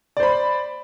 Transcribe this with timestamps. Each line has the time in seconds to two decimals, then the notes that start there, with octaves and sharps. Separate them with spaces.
0.17 D5
0.20 C5
0.23 B5